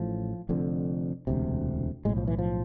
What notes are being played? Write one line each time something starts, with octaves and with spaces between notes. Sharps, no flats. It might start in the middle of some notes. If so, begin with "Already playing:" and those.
Already playing: A1 A2 F3
F1 F2 D3
E1 D2 C3
B1 A2 G#3
F3
E3
F3